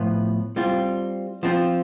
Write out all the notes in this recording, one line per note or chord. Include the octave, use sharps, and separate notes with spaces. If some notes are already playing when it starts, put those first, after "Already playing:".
Already playing: A2 F3 B3 F4 C5
G3 C4 F4
F3 C4 F4